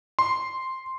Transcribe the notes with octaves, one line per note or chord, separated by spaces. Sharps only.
C6